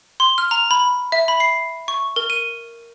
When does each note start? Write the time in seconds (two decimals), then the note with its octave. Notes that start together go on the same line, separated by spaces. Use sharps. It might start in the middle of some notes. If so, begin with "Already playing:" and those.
0.20 C6
0.38 F6
0.51 A#5
0.71 B5
1.12 E5
1.28 B5
1.40 C7
1.88 C#6
2.16 A#4
2.30 D#7